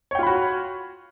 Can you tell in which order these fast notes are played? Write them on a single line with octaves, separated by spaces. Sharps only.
C#5 G5 F4 B5 F#4